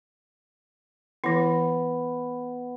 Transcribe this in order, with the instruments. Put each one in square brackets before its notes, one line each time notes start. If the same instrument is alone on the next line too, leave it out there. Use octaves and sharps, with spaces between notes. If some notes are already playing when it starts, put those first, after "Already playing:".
[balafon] E3 E4 [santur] B3